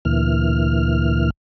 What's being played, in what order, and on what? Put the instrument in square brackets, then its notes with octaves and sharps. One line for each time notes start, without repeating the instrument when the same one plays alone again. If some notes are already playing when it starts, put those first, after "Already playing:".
[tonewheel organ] D2 A#2 E3 F6